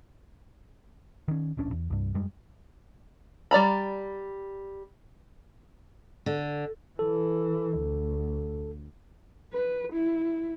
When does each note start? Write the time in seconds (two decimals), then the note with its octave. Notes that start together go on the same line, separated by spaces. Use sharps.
1.28 D#3 C#4
1.57 D1 A#1 C#4 D4
1.72 E2
1.90 C2 G2
2.15 F#2 G3 G#3
3.51 G3 D5 A#5 B5
6.26 D3
6.99 E3 A4
7.78 D2
9.53 B4
9.93 E4